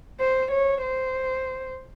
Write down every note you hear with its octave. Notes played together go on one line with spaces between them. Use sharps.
C5
C#5
C5